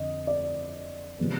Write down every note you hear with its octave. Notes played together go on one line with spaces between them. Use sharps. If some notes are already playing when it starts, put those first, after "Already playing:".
Already playing: F2 D3 D#5
D5
C3 F3 G#3 B3